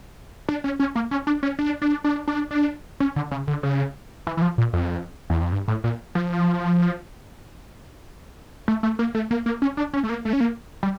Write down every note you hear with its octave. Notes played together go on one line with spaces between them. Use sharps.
D4
C#4
C#4
A#3
C#4
D4
C#4
D4
D4
D4
D4
D4
C#4
D3
C#3
D3
C#3
E3
E3
F3
A#2
F2
E2
F2
G2
A2
A#2
F3
A3
A3
A#3
A3
A#3
A#3
C#4
D4
C#4
A3
A#3
A3
C#4
A#3
G3